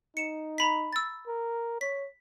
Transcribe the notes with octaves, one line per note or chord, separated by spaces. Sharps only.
D#4 C#7 E7
A#5 B5 B6
E6 A6
A#4
C#5 B6